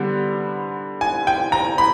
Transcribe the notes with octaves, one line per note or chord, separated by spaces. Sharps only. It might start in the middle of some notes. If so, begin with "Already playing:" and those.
Already playing: D3 G3 B3
G#5
G5
A#5
B5